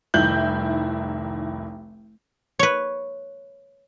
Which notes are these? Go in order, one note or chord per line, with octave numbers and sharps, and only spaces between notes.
F1 C2 D#3 E4 G6 F#7
B4 C#5